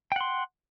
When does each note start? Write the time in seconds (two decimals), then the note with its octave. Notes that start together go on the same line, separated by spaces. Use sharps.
0.12 G5
0.16 F#5
0.21 C6